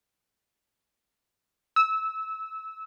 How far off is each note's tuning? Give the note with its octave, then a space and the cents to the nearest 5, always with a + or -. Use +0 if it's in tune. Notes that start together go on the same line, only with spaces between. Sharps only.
E6 -20